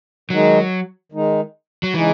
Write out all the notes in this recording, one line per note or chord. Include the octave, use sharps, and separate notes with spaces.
D#3 F#3 G#3 D#4
D#3 G#3 D#4
F#3
C#3 E3 G#3 D#4 G#4